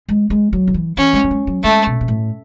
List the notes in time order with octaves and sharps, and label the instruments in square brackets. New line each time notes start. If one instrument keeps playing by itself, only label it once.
[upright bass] G#3
G#3
F#3
D3
E3
[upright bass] E3 [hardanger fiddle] C#4
[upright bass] G#3
F#3
G#3
F#3
[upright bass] G#3 [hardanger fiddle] A3
[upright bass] B2
B2
A2